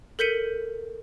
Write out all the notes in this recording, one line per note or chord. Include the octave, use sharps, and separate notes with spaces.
A4 A#4 G6 B6 C#7 D#7